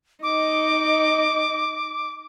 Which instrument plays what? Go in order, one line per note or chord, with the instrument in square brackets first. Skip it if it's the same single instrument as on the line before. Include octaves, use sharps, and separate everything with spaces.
[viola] D#4 D#5 [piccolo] D6